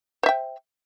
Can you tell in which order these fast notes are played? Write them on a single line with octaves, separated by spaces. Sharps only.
C5 E5 G5